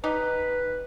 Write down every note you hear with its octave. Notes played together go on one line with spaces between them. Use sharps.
D#4 G4 B4